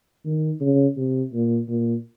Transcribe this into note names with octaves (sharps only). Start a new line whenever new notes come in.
D#3
C#3
C3
A#2
A#2